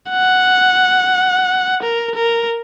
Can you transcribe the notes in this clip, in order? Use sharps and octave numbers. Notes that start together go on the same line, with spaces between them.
F#5
A#4
A#4